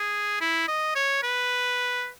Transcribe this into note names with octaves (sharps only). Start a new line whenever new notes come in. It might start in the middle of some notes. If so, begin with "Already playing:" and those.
Already playing: G#4
E4
D#5
C#5
B4